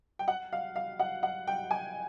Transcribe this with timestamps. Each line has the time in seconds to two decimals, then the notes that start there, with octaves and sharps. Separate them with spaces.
0.19 G5
0.28 F#5
0.53 F5
0.76 F5
0.99 F#5
1.23 F#5
1.47 G5
1.71 G#5